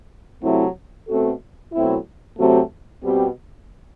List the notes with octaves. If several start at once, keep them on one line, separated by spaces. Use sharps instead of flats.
C3 F#3 A3 C4 E4
B2 A3 C4 F#4 A4
B2 F#3 A3 C4 E4
C3 F#3 A3 C4 F#4
B2 G3 C4 G4